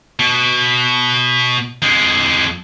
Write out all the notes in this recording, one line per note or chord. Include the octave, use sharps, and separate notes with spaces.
B2
F2 G#3